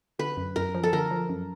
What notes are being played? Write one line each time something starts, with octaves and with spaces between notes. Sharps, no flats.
D3 B4
F#2
F#2 A#4
F3
A4
D3 A#4
F3
F#2